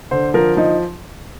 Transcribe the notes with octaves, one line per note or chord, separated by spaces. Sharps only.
D3 C5
F3 A#4
F3 D#4